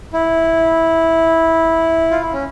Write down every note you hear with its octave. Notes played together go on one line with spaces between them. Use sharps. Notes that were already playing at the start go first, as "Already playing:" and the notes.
E4
F4
E4
C#4